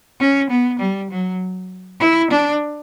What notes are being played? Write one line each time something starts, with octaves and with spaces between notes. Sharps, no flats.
C#4
B3
G3
F#3
E4
D4